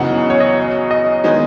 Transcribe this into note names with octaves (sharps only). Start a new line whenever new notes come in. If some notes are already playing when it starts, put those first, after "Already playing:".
Already playing: F#2 C#3 E3 B3 D#4 F#5
C#5
D#5
D#5
D#3 G#3 B3 D#4